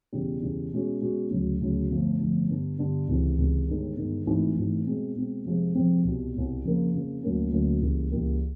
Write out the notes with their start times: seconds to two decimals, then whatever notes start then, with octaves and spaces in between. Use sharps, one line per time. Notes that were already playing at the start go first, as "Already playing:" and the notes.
0.13 E1 E2 C#3 E3 G3
0.42 E1 E2 C#3 E3 G3
0.72 B2 G#3 C#4 F#4
1.01 B2 G#3 C#4 F#4
1.31 D2 C#3 F#3
1.61 D2 C#3 F#3
1.90 G1 F2 D3 F3 A3
2.19 G1 F2 D3 F3 A3
2.49 G2 D3 G3 B3 D4
2.79 G2 D3 G3 B3 D4
3.08 C#2 C3 E3
3.38 C#2 C3 E3
3.68 G1 G2 D#3 G#3 B3
3.97 G1 G2 D#3 G#3 B3
4.26 G#1 G#2 E3 A3
4.56 G#1 G#2 E3 A3
4.86 B2 G#3 C4
5.16 B2 G#3 C4
5.45 F2 C3 F3 G#3 C4
5.75 F2 C3 F3 G#3 C4
6.04 C2 B2 G3
6.34 C2 B2 G3
6.63 F2 C#3 F3 A#3
6.93 F2 C#3 F3 A#3
7.22 D2 D3 F#3 A#3 C#4
7.52 D2 D3 F#3 A#3 C#4
7.82 C#2 C#3 E3 G3 A#3
8.12 C#2 C#3 E3 G3 A#3